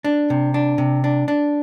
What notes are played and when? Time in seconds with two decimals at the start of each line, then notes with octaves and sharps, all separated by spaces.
0.04 D4
0.30 C3
0.54 D4
0.78 C3
1.04 D4
1.28 D4